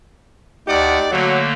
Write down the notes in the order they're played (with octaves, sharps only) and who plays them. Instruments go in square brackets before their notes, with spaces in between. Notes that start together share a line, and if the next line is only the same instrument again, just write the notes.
[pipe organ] D2 F#5 [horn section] D#4 G4 D5
[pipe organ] D3 A3 A#3 [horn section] F#3